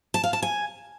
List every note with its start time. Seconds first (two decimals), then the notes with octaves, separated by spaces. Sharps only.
0.14 A5
0.24 F5
0.33 A5
0.42 G#5